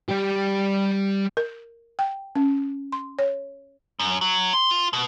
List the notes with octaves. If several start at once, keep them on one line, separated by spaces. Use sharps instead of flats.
G3 G4
A#4
G5
C#4
C6
C#5
F#2
F#3
C6
F4
B2